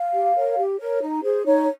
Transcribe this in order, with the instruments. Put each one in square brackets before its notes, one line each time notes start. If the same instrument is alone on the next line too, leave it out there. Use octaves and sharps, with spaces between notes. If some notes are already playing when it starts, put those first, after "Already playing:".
Already playing: [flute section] F5
G4
A#4 C#5
G4
A#4 C#5
D#4
G#4 C5
D#4 C#5